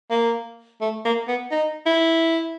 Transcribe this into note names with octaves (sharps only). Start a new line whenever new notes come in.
A#3
A3
A#3
B3
D#4
E4